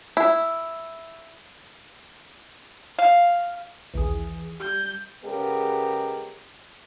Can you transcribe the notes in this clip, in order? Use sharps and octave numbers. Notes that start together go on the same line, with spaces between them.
E4
F5
A#1 D#2 E3 G#4
G3 G6
C#3 G#3 B3 G4 A#4